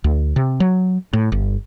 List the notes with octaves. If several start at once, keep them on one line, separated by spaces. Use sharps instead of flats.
D2
C3
F#3
A2
G1